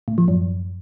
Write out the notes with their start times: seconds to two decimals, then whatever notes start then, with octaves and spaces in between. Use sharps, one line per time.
0.08 A2
0.18 F3
0.28 F#2